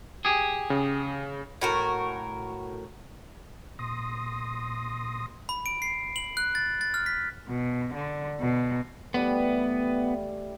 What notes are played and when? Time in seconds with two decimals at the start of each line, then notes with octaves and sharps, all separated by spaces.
0.25 G4 G#4
0.70 C#3
1.61 A2 F#4 A#4
3.79 A#2 C6 D#6 A#6
5.49 B5
5.66 D7
5.82 C7
6.16 F#7
6.37 F#6
6.55 A6
6.81 A6
6.94 F6
7.06 B6
7.48 B2
7.94 D3
8.40 B2
9.14 E3 G3 A3 B3